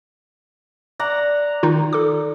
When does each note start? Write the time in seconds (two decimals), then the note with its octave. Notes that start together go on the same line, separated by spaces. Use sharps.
1.00 D5 F#5 A#5
1.63 D#3 D#4 F4
1.93 A4 D6